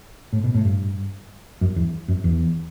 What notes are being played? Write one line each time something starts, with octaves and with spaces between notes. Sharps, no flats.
A2
B2
A2
G2
F#2
E2
F#2
E2